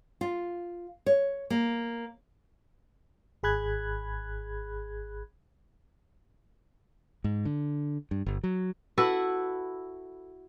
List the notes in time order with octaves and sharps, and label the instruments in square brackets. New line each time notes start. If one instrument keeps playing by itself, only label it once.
[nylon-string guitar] F4
C#5
A#3
[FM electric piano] G#1 G#4 B5 F#6 G#6
[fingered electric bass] G#2
D3
G2
G1
F#3
[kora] E4 F#4 A4 B4